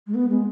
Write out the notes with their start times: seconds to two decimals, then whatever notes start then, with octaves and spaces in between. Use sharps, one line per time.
0.07 G#3
0.14 B3
0.30 G#3